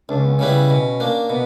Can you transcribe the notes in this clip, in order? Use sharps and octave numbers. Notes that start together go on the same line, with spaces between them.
C#2 D4
C#4
B3
C#4
C#3 G3 B3 E4
B2
A#3 D4
B2 B3